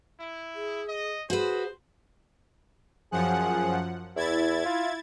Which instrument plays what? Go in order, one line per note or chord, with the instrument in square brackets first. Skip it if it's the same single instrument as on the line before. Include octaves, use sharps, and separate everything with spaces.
[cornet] E4
[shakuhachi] G#4
[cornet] D#5
[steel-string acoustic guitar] F#4 B4 [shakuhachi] G#4 [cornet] C5
[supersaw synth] F#2 F3 F#5 [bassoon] G#4
[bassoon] E2 [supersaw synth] E4 G#6 A6
[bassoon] F4